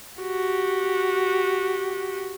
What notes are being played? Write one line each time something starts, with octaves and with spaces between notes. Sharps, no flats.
F#4 G4